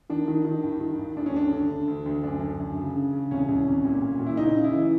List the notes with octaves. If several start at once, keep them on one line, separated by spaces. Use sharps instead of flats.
D#3 D4
D#3
D#3
G2
D#3
G2
D2 D4
C#4
D3 D4
D3
D3
D2
D2
F#2 D4
F#2
F#2
C#3
C#3
C#3
C2 C#4
C2
C2
A#2
A#2
A#2
E4
C#3 D#4
C#3
E4
E3